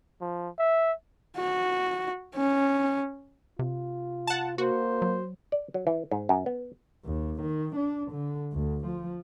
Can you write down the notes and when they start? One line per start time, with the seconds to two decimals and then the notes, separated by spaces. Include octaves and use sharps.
0.21 F3
0.59 E5
1.37 F#4
2.35 C#4
3.59 C3 F4
4.27 F#5 A5
4.58 A#3 F#4 C5
5.02 F#3
5.52 D5
5.74 F#3
5.87 E3
6.11 G#2
6.29 F#2
6.46 B3
7.05 D#2
7.42 D#3
7.76 D4
8.12 D3
8.53 D2
8.86 F3